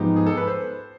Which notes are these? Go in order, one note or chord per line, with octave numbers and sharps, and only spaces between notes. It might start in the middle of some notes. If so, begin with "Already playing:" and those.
Already playing: G#2 F3 G#3 B3 D#4 G4
G#4
A4
B4
C5